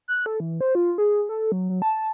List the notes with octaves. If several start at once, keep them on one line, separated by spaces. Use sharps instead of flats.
F#6
A4
E3
C5
F4
G#4
A4
F#3
F#3
A5